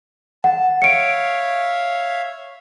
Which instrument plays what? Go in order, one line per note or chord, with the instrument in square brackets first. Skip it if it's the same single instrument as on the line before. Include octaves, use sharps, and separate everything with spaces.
[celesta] F#5 [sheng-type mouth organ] A5
[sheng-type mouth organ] C#5 E5 F5 [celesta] C#7 D7